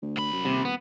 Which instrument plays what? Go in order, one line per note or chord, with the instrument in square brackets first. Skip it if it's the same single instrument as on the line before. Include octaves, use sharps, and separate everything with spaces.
[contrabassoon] D2
[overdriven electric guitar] C2 B5
[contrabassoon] F#2
[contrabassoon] D#1 [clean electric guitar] C3
[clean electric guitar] B3